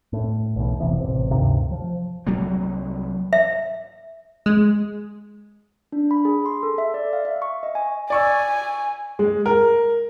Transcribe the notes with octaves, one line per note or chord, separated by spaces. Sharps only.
A2
B1 E2 B2
F1 C3 E3 B3
A1 C3
D2 G2 C3 D#3
F3
C2 F#3 G3 A#3
E5
G#3
D4
B5
G#4
C6
A4
E5
D5
F5
E5
C#6
D#5
G#5
D5 G#5 C#6 E6
G#3
A#4